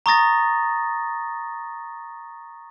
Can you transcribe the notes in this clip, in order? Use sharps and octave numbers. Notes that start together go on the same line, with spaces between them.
A#5 C#6 D#6 A6 A#6